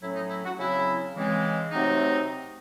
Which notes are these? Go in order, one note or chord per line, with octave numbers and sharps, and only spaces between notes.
A2 F#3 A3 C#4 E4
D#4
E4
F#4
C#3 F#3 C4 E4
C#3 E3 G#3 C4
C3 F#3 A3 C4 D#4